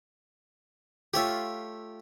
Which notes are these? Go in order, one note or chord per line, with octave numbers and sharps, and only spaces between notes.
A3 F4 G4 C#5 E5